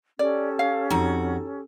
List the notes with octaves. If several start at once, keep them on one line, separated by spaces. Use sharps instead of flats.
C#4 G4 A4 D5
F5
F2 D#4 F#4